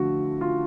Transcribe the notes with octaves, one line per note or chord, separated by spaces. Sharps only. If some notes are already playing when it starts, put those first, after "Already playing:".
Already playing: D3 F3 A3 F#4
F4